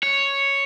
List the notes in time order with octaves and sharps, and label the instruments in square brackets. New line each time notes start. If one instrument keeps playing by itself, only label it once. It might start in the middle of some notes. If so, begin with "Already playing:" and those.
[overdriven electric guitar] C#5